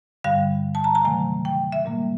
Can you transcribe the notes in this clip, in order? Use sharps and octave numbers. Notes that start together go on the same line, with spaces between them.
G2 D3 G3 F5
A5
A#5
A#5
C3 D#3 F#3 A3 G#5
G5
E5
A#2 G3 A#3